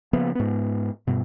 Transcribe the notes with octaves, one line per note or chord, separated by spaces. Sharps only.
C#3 F3 A#3 B3
G#2 B3
G2 B2